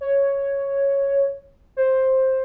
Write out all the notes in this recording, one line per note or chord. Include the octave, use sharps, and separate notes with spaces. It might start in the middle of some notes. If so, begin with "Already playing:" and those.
C#5
C5